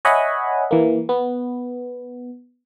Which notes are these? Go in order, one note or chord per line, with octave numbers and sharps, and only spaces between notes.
C#5 D#5 E5 F#5 G#5 B5
E3 A#3
B3